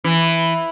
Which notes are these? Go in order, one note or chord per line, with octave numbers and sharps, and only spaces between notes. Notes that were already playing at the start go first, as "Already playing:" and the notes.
E3